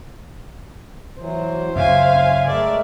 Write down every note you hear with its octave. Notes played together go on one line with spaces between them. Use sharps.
E3 F#3 C5
F#2 C#3 C#4 E5 F5 G#5
G#3 A3 A#4 D5 E5